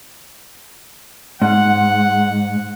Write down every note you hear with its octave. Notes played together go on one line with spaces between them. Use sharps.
G#2 F#5